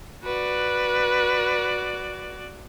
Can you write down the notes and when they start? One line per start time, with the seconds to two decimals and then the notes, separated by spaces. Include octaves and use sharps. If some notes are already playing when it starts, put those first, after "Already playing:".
0.24 F#4 B4 D5